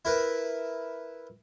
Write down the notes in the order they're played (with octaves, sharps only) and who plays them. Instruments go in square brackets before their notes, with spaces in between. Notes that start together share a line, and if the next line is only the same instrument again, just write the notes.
[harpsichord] E4 A#4 B4